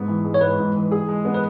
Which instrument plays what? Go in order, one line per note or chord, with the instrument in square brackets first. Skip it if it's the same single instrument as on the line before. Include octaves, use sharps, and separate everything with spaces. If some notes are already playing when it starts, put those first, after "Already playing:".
Already playing: [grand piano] G#2 B3
E3
G#3
[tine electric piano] C#5
[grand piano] G#2 [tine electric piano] B4
[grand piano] G#2
E3
G#4
G#3
B3
[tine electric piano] B4